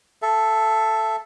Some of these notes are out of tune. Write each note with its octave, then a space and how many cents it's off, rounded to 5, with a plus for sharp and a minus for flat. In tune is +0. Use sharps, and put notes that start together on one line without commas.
A4 +0 E5 +25